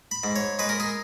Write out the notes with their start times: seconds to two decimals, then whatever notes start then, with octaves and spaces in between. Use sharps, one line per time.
0.11 B5
0.24 G#2
0.36 C#5
0.59 G#3 B4
0.69 A#4
0.80 G#4